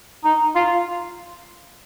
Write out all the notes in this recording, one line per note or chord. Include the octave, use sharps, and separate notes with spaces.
D#4
F4